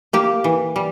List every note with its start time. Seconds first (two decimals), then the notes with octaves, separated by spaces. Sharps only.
0.13 A#3 G4
0.44 E3
0.76 G3